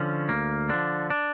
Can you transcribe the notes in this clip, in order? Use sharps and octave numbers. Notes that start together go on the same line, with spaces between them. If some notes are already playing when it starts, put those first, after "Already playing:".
Already playing: D3 F3 C#4
D2 A#3
D3 F3 D4
D4